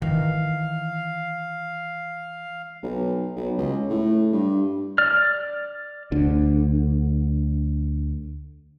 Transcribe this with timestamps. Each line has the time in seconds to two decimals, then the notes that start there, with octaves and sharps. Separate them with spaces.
0.02 D#3 E3 F5
2.83 B1
3.36 B1
3.58 C#2
3.89 A2
4.32 G2
4.98 D5 F6
6.12 D2 D3